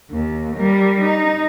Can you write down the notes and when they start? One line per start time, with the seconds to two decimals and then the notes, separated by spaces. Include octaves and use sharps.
0.11 D#2
0.57 G3 A#4
1.01 D#4